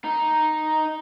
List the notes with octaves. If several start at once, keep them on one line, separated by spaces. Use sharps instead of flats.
D#4